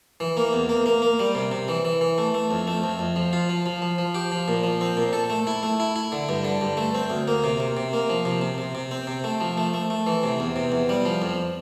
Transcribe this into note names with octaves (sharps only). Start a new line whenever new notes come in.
E3
A#3
E2
A#3
A#3
A#3
G3
C3
C3
E3
E3
E3
A3
A3
F2
A3
F2
F2
F3
F4
F3
F3
F3
F3
G4
F3
A#2
F3
C4
A#2
A4
A3
E4
A3
E4
E4
D3
G2
D3
G2
A3
C4
D2
A#3
C3
C3
C3
A#3
F3
C3
C3
C3
C3
C4
C3
A3
F3
A3
A3
A3
E3
C3
E2
C3
E2
G3
F3
F2